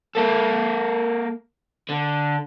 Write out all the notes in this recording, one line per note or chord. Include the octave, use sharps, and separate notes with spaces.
A#3 A4
D3